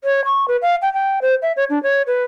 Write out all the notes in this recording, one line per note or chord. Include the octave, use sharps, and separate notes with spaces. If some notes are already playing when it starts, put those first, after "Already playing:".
C#5
C#6
B4
F5
G5
G5
C5
E5
C#5
D4
C#5
B4